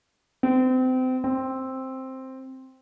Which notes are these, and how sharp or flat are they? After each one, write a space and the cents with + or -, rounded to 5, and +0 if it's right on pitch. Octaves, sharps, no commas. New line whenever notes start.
C4 -30
C4 +5